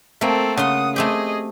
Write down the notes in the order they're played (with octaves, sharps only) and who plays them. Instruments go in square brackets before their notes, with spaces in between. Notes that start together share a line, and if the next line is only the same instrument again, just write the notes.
[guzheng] A3 A#3 [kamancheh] C4 A4
[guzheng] C#3 F5 C6 [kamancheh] F#5 D#6
[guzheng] A3 C4 G4 [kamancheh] G#4 D#5